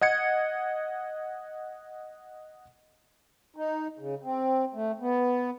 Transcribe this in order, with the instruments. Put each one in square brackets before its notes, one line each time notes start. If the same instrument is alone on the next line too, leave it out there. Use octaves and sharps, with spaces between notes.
[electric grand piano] D#5 F#5 G#6 C#7
[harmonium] D#4
C#3
C4
A3
B3